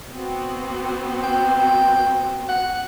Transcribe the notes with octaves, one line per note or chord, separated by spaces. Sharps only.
B3 C4 F#4
G5
F#5